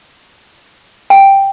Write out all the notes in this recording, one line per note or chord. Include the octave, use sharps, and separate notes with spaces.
G5